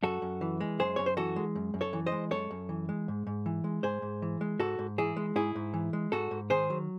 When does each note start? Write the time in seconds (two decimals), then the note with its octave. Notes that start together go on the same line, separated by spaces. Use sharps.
0.03 F#2 F#4 A4
0.22 F#2
0.41 E3
0.60 G#3
0.79 F#2 G#4 C5
0.96 F#2 C#5
1.06 C5
1.17 E3 F#4 A4
1.36 G#3
1.55 F#2
1.74 F#2
1.81 A4 C#5
1.93 E3
2.06 C5 D#5
2.12 G#3
2.31 F#2 A4 C#5
2.51 F#2
2.69 E3
2.89 G#3
3.08 G#2
3.27 G#2
3.46 E3
3.64 G#3
3.83 G#2 G#4 C5
4.02 G#2
4.22 E3
4.41 G#3
4.59 G#2 F#4 A4
4.79 G#2
4.98 E3 E4 G#4
5.16 G#3
5.36 G#2 E4 G#4
5.55 G#2
5.74 E3
5.93 G#3
6.12 G#2 F#4 A4
6.31 G#2
6.50 D#3 G#4 C5
6.70 F#3